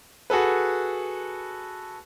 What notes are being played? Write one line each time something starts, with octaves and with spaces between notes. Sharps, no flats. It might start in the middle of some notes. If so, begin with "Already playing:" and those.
F#4 G#4 A4 B4